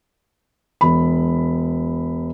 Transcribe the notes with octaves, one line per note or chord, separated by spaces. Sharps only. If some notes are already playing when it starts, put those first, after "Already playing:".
E1 B5